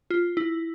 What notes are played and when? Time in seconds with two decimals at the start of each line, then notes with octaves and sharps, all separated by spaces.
0.10 F4
0.37 E4